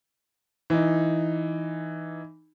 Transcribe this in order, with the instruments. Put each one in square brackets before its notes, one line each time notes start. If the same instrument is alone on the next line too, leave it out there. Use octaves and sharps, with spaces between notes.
[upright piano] E3 D#4